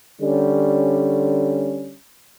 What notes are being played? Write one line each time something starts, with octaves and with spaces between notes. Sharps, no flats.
D3 G3 C#4